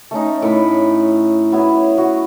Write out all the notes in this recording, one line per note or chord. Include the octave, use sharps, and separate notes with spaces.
A3 C#4 D#4
A2 B5
F#3 B3 E4
F#4